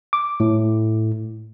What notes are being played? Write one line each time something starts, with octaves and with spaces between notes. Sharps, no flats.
D6
A2